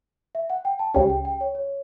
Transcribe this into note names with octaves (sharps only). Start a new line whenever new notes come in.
E5
F#5
G5
A5
C#2 C#3 G3 C#4 G5
G5
G5
C#5
C#5